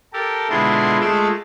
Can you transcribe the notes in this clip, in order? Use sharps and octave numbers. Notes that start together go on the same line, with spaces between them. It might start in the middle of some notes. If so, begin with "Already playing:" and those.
G4 A4 A#4
B2 D3 G#3 E4 F4 C6
G#3 A3 F4 D6 E6